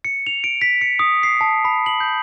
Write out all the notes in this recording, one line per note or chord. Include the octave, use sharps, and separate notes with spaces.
C#7
F7
D7
B6
C#7
D#6
C7
A5
B5
F#7
G6